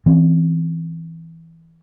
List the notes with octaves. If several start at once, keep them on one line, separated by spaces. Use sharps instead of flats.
E3 C4 C#4